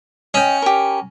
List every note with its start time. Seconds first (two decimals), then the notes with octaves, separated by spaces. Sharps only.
0.34 C#4 D#5 G5
0.62 G4 A#4